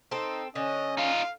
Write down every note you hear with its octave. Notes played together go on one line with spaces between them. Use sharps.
C4 D#4 A4
D3 C#4 D#5
D#4 F4 F5